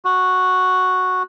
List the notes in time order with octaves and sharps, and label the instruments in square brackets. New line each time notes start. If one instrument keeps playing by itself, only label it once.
[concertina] F#4